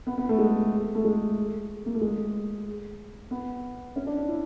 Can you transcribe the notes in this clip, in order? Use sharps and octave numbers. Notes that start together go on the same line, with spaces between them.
B3
B3
A3
G#3
A3
G#3
A#3
A3
G#3
B3
C#4
D4
D#4
E4